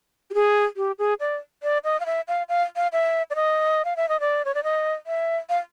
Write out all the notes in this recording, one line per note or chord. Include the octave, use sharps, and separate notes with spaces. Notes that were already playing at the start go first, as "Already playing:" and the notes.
G4
G#4
G4
G#4
D5
D5
D#5
F5
E5
F5
F5
F5
E5
D5
D#5
F5
E5
D#5
D5
C#5
D5
D#5
E5
F5